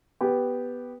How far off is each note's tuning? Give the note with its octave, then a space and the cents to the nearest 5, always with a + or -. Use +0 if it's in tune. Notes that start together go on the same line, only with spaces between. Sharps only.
B3 +0 G4 +0